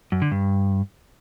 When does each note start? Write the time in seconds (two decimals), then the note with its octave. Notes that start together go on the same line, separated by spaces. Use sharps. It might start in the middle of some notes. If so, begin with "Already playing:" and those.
0.12 F#2
0.22 D3
0.31 G2